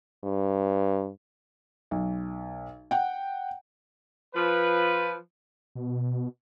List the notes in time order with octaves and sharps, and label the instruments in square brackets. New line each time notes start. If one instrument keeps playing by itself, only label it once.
[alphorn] G2
[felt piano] B1
F#5 G5
[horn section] F3 B4
[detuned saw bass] B2